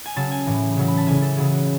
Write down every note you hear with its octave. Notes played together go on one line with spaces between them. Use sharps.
G#5
C#3 F#3 A5
G#5
A2 E3
C#3 F#3
B5
A5
C#3 E3 G#5
A4
C#3 F#3 G#4
F#4